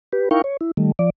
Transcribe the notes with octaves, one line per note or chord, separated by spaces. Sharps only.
G4 B4
D#4 E4 A#4 F5 G5 C#6
C#5
E4
D#3 G3 A3
F3 D5